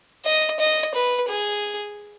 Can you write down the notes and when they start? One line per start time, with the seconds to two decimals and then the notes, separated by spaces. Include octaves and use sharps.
0.25 D#5
0.60 D#5
0.95 B4
1.29 G#4